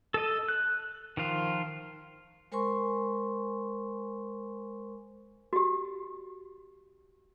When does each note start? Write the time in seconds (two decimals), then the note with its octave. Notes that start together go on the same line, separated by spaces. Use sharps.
0.14 A4 D#5
0.49 F#6
1.17 D#3 F3 F4
2.52 G#3 A#4 C5 G#5 C6 C#6
5.53 F#4 G4